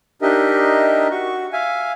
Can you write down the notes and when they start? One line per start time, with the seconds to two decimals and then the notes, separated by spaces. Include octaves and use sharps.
0.22 D4 D#4 G4 A#4 D#5 E5
1.11 F#4 C#6
1.53 E5 F5 G#5